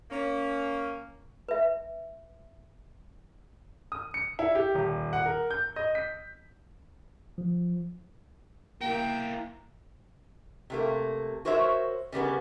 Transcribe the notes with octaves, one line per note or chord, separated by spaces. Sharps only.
A#3 C#4
B4 E5
D#6
C#7
E4
G4
D#1
F#5
A#4
G6
D#5
B6
F3
A#3 E4 A#4 G5
C3 A3 A#3
F#4 A#4 C5 C#5 E5
C#3 G3 A#3 B3